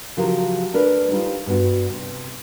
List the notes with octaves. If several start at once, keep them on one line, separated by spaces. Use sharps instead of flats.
C#3 F3 F#3 F4 G4 A#4
A3 D4 A#4 B4
G3 D#4 F4 C5
G2 B3 F#4
C3